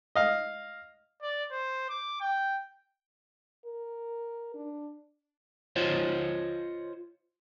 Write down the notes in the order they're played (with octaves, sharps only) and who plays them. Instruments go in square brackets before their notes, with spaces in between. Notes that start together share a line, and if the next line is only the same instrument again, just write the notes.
[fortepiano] D#5 F5
[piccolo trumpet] D5
C5
D6
G5
[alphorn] A#4
D4
[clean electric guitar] F4 C5 C#5 D#5